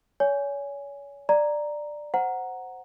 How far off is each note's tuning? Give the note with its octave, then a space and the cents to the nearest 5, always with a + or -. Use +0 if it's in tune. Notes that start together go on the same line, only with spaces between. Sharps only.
C#5 +35 G#5 +0
D5 +10 A#5 +0
C5 -5 F#5 +0 A#5 +0